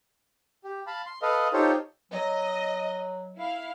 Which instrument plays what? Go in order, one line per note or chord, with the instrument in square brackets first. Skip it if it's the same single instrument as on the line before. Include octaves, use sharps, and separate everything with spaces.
[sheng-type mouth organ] G4
F5 A5 B5
C6
A4 B4 D#5 F5
D#4 F4 G4 A4 C5 C#5
[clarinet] F#3 [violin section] D#5
[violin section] E4 F5